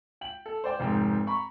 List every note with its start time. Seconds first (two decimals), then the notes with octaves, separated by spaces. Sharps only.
0.21 G5 F#7
0.46 A4
0.64 C5 D5 G5
0.80 F1 G#2 G5
1.27 A#5 B5 C#6